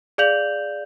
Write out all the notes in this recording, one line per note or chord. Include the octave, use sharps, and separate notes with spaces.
G#4 D5 F5 G6 F7 F#7